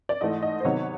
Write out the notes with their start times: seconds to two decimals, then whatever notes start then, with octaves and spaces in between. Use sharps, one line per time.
0.09 D5
0.21 G#2 E3 A3 D#5
0.42 D#5
0.60 C5
0.64 C3 D#3 F#3 B3 C#5